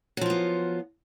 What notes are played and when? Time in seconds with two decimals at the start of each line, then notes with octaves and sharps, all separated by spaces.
0.17 F#3
0.21 F3
0.26 F4
0.30 B3